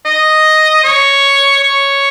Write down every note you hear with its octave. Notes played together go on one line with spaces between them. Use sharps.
D#5
C#5
C#5